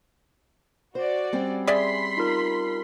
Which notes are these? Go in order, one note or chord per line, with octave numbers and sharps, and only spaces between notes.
F#4 C5 D5
G3 C4 C#4
G#4 D5 E5 B5 C6 B6
D#4 F4 A#4